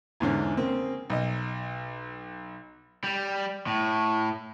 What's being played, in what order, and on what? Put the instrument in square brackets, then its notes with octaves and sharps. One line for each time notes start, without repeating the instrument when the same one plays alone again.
[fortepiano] E2 G#2 D3 C#4
C#3 A#3 C4
B1 D#5
[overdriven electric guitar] G3
A2